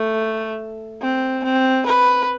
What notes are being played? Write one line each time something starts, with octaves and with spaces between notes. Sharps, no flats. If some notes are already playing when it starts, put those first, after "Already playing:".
Already playing: A3
C4
C4
B4